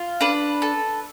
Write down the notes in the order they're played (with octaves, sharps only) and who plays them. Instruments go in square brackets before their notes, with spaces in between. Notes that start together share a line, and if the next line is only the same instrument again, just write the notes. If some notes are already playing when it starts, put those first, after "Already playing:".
Already playing: [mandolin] F4
D4 B4
A4